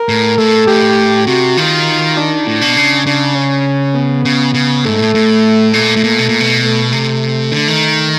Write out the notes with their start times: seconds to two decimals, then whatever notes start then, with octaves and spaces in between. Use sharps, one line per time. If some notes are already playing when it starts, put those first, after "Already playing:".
Already playing: A#4
0.09 A2
0.38 A2 A4
0.67 A2 G4
1.27 C3 F#4
1.57 D#3 F4
2.17 D4
2.47 A2
2.61 B2
2.77 C#3
3.06 C#3 D4
3.35 C#4
3.95 B3
4.25 C#3
4.54 C#3
4.84 G#2 A3
4.99 A2
5.15 A2
5.73 A#2 A3
5.96 A2
6.03 A#2
6.19 B2
6.29 A#2
6.40 B2
6.63 A3
6.92 C3 A3
7.52 D3
7.68 D#3